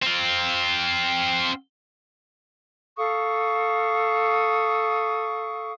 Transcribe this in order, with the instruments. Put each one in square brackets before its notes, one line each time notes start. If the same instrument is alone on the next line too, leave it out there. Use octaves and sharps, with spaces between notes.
[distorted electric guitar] C4 F4
[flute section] A4 F5 C#6 D#6